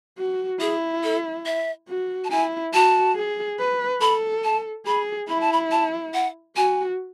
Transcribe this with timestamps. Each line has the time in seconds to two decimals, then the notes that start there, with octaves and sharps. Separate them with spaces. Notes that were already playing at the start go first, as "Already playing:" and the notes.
0.18 F#4
0.60 E4 G#4
1.03 A4
1.46 E5
1.88 F#4
2.24 A5
2.30 E4 G#5
2.73 F#4 A5
3.16 G#4
3.59 B4
4.01 A4 B5
4.44 A5
4.86 G#4 B5
5.28 E4 B5
5.40 A5
5.52 B5
5.71 A5
6.14 F#5
6.56 F#4 G#5